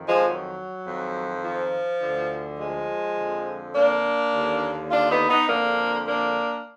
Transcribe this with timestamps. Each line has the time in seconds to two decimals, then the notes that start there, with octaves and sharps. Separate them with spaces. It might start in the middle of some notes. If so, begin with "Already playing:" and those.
Already playing: F2 D#3
0.08 F3 G#3
0.27 F#3
0.86 F2 D#3
1.43 F3
2.01 D2 D3
2.59 F3 G#3
3.17 F2 D3
3.75 A#3 D4
4.33 D#2 D3
4.91 D4 F4
5.10 B3 D#4
5.29 B3 D#4
5.49 F2 D3 A#3 D4
6.07 A#3 D4